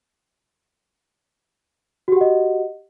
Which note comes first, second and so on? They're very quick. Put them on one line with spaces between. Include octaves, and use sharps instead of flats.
F#4 G4 F#5 D#5